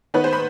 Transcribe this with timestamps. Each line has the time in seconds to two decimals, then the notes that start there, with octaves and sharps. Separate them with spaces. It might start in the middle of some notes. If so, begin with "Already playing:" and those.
0.14 D#3 B3 B4
0.24 C5
0.33 B5